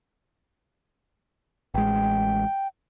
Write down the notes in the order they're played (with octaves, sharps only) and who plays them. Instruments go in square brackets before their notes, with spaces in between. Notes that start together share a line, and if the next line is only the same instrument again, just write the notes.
[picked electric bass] A1 G#3 [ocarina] G5